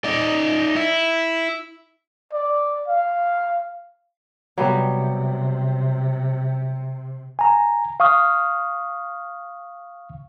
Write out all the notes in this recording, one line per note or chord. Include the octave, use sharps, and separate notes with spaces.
D#4 D5
E4
D5
F5
C3 F#3 G3 B3
G#5 A#5
F5 C#6 D#6 F6